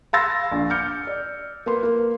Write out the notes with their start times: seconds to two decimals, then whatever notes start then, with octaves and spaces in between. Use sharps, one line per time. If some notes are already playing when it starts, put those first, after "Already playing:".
0.13 F5 B5 C6 E6 A6 A#6
0.52 A#1
0.70 D6 F6 G6 C#7
1.07 D5
1.66 A#3 B4 C6
1.83 A#3